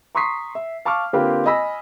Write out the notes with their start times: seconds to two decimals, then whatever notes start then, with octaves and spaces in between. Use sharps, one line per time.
0.15 A#5 C6 C#6 D#6 B6 C7
0.55 E5
0.85 F5 A5 C#6 D6 F6
1.13 D3 A#3 C4 F4 G4 B4
1.46 D#5 G#5 B5 E6 A#6 B6